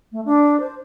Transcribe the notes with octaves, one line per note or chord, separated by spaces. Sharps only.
A3
D4
C5